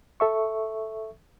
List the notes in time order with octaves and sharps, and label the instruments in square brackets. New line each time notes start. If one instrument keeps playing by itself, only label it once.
[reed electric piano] A4 E5 C#6